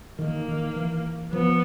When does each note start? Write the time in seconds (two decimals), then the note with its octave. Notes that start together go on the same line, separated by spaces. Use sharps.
0.19 D#3 A#3
0.48 D#3
0.76 E3
1.32 F3 B3